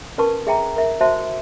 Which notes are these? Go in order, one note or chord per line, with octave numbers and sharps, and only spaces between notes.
C#4 A#4 B4 A5 C#6
G#4 E5 G5 A#5
A#4 E5
F#4 C5 E5 A5